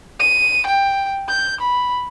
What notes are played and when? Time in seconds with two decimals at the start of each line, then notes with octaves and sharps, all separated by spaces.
0.20 D#7
0.66 G5
1.29 G6
1.60 B5